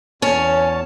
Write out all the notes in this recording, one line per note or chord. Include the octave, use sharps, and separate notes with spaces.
E2 C#4 C#5 A5